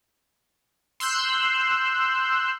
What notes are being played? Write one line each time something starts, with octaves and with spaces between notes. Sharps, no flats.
C6 E6 F#6 G6